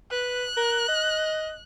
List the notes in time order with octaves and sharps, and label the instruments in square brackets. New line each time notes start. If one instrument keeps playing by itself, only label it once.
[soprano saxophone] B4 [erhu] F#6
[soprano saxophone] A#4
D#5